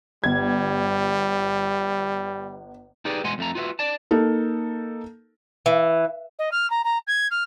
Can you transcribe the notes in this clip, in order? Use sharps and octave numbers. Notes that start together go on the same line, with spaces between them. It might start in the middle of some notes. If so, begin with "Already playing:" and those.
G1 G3 G#6
D#4 G4 G#4 B4 D5
E2 B2 G#3 F#5 G#5 C6
F2 A3 A#5
F4 F#4 B4 C#5 E5
D5 A5
A#3 D#4 A4
E3
D#5
F6
A#5
A#5
G#6
F6